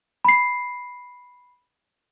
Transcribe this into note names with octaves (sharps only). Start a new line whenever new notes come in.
B5 C7